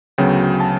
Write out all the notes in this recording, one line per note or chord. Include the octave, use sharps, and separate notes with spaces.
D2 C#3 F#3 B3 G5
G5
A5